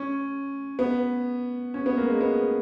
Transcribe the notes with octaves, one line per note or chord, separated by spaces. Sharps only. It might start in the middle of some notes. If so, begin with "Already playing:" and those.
Already playing: C#4
B3
C#4
B3
A#3
G#3
B3